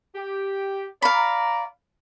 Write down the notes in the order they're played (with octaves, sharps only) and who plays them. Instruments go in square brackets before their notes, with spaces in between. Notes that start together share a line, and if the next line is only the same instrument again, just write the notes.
[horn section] G4
[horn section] D5 A#5 [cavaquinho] F5 B5